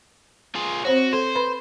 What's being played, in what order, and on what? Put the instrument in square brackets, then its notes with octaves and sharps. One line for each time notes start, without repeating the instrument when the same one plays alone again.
[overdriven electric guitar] F4 G#4
[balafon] C4 C5 C#5 [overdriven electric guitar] F#4
[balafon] A4 [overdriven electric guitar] C5
[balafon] B4 B5